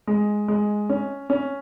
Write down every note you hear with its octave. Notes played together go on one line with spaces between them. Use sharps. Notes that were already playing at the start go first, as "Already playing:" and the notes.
G#3
G#3
C#4
C#4